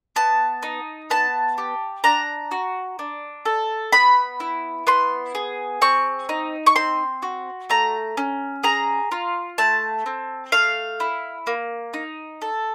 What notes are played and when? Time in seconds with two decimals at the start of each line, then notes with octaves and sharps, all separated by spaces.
0.16 B3 A5
0.63 D#4
1.10 B3 A5
1.58 G4
2.04 D4 A#5
2.51 F#4
2.99 D4
3.45 A4
3.93 B3 B5
4.40 E4
4.87 B3 C6
5.35 G#4
5.82 C4 C#6
6.29 D#4
6.66 C#6
6.75 C4 C6
7.22 F#4
7.70 A3 A#5
8.17 C#4
8.63 G#4 A#5
9.11 F4
9.58 A3 A5
10.06 C4
10.52 A3 F5
11.00 E4
11.47 A#3
11.94 D#4
12.42 A4